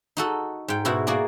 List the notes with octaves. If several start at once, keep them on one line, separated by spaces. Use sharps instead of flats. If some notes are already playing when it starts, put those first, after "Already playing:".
D#4 F#4 A4
G#2 G5
G#2 B2 E4 F#4
A#3 F#4 G#4 D5